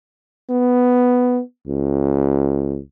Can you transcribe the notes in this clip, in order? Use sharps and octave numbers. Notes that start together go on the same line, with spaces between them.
B3
C#2